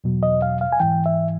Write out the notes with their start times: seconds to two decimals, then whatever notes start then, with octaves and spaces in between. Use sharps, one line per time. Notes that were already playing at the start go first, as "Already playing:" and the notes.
0.04 E2 B2 F#3
0.23 D#5
0.42 F5
0.61 F5
0.72 G#5
0.80 G#2 E3 G5
1.06 E5